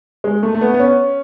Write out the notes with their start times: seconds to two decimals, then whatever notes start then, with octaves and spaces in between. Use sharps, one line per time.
0.24 G#3
0.43 A3
0.55 A3
0.61 B3
0.74 B3
0.80 C#4